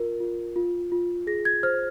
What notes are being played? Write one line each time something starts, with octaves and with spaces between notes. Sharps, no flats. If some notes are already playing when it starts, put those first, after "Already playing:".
Already playing: F4 A#4
F4
F4
F4
G#4 A#6
G#6
C5 F6